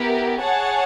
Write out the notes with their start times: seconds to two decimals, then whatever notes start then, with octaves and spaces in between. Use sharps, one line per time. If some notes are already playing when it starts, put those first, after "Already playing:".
Already playing: B3 E4 G4 A#4
0.40 G#4 C#5 F#5 A5